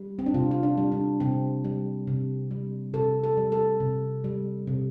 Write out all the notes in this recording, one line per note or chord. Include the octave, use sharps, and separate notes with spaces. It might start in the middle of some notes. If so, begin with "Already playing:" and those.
Already playing: G3
C4
D4
C3 F4
F4
D4
G3
D4
C3 C4
G3
C3
G3
C3 A4
A4
G3
A4
C3
G3
C3